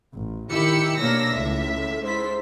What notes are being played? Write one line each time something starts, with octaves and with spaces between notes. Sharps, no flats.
A1
D#3 E4 G4 B5 E6 C#7
B2 A#3 D4 C#5 E6 A#6
C#2 A2 E5
G#2 E4 C5 B6